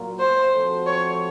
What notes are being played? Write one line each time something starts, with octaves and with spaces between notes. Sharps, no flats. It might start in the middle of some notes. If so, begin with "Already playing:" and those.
Already playing: A#2 F#3 A#3 F4 A#4
C5
F3 A3 C4 F#4 A4
C#5